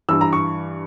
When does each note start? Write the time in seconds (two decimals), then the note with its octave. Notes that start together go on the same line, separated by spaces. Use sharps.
0.09 G2 E3 E6
0.21 A#5
0.33 C#6